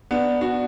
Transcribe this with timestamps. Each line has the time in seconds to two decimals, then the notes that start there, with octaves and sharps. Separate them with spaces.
0.11 B3 D4
0.41 D4 F#4